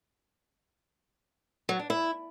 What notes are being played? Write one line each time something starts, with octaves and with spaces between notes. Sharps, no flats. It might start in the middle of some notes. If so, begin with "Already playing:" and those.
F#3
D4
E4